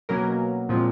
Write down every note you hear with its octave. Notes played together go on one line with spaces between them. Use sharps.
B2 F#3 A#3 C#4 A#4
A#2 F3 G#3 C4